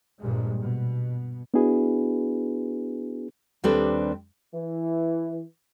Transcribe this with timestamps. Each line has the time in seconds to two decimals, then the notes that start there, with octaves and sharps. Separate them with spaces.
0.19 A#1 G2 A#2 G#3
0.61 B2
1.54 B3 D4 E4 F#4 G#4 B4
3.64 D#2 G3 C4 D4 A4 B4
4.54 E3